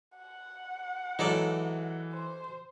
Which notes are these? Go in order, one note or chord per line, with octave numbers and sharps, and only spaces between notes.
F#5
E3 F#3 G#3 D#4 F#4 A4 D5
C5